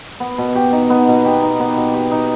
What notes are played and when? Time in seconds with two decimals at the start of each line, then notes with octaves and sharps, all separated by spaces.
0.20 B3
0.38 B2
0.55 G4
0.73 D#4
0.90 B3
1.08 B2
1.25 G4
1.42 D#4
1.60 B3
1.77 B2
1.94 G4
2.11 D#4